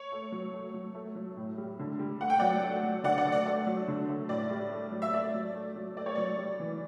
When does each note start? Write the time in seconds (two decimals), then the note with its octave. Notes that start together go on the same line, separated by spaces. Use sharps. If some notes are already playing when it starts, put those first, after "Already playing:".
Already playing: C#5
0.12 A3
0.32 F#3
0.54 A3
0.74 F#3
0.95 A3
1.16 F#3
1.37 A2
1.58 G3
1.79 D3
1.99 G3
2.20 A3 F#5
2.30 G5
2.39 F#3 D5 F#5
2.63 A3
2.83 F#3
3.04 D3 D5 F#5
3.18 D5 F#5
3.25 A3
3.32 D5
3.46 A3
3.67 F#3
3.88 D3
4.09 A3
4.29 A2 D5
4.51 G3
4.72 A3
4.92 F#3
5.02 E5
5.13 A3 D5
5.34 F#3
5.55 A3
5.76 F#3
5.96 A3 D5
6.06 C#5
6.15 F#3 D5
6.38 G3
6.60 E3